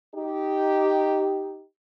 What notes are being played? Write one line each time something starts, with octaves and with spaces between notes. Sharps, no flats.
D#4 G4